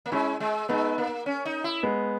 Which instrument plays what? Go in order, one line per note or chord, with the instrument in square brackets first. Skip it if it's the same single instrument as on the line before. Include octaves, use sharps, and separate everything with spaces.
[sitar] A#3
[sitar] G#3 [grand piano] C#4 E4
[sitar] G#3
[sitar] G#3 [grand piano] B3 D#4
[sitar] A#3
C#4
D#4
E4
[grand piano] G#3 B3